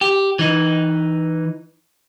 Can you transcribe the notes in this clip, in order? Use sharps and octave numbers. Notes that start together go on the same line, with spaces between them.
G4
E3 D#4